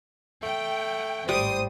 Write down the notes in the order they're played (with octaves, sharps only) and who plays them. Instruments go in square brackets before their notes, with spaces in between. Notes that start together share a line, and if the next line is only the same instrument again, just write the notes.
[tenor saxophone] A3 [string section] G5
[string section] G#1 A2 [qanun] G3 [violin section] C5 D#6